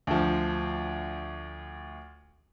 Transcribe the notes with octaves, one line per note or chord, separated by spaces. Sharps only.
D2 F3